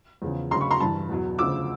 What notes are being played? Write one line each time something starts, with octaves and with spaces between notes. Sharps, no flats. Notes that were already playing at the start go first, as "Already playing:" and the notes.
E2 C#3 F3
D2 C#3 F#3 A#5 C6
B5 C#6
A#5 C6
G2 E3 A5 B5
E2 B2 F#3
D2 C#3 F3 D6 E6